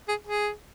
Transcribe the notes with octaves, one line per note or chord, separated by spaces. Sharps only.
G#4
G#4